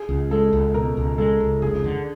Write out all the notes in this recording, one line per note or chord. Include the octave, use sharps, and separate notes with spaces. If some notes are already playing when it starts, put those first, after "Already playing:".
Already playing: G#4
C#2
G#3 A4
C#2
B2 A#4
C#2
G#3 A4
C#2
F1 G#4
D3